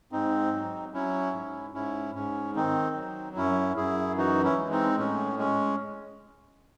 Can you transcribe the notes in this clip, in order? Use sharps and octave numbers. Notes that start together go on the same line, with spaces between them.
G#2 C4 D#4
F#3
F#3 C#4 E4
G#2
G#2 C#4 E4
G#2 C#4
D#3 C4 D#4
F#3
F#2 C#4 E4
F#2 E4 G#4
E3 D#4 F#4
C#4 E4
G#3
C4 D#4
A2 C#4
G#3 C#4